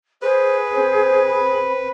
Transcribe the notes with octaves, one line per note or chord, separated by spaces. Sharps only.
G#4 B4 C5
C4 C5
B5